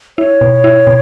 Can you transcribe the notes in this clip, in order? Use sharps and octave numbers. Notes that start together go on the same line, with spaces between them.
E4 C#5
B2
E4
B2